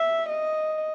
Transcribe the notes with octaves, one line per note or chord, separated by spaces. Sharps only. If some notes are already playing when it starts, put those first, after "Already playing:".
Already playing: E5
D#5